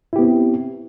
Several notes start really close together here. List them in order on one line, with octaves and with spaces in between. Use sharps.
E4 G4 B3 C4